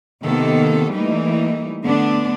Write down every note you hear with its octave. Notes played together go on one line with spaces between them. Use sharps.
C3 D#3 A#3 B3 A4
E3 G3 A3 A#3 D#4
D3 A3 B3 D4